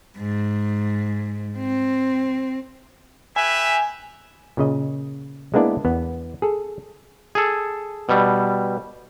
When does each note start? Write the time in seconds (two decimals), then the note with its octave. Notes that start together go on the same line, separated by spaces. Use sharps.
0.18 G#2
1.58 C4
3.36 G4 B4 E5 G#5
4.57 A#2 C#3 D#5
5.54 G#3 A#3 B3 D4 E4 D5
5.85 E2 B3
6.42 G#4 A4
7.35 G#4 A4
8.09 B2 G3